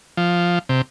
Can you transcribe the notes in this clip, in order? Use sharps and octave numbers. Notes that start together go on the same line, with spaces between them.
F3
C3